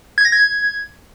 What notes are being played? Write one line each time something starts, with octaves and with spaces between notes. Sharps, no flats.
G#6
A#6
G#6